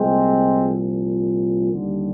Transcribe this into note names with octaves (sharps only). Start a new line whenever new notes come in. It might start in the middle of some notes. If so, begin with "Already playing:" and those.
Already playing: C2 A#2 F3 G#3 C4
D#2 D3 G3